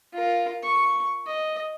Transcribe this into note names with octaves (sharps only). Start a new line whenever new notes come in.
F4 A#4
C#6
D#5